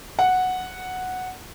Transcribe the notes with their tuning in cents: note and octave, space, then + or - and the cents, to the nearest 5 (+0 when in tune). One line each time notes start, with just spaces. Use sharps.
F#5 -5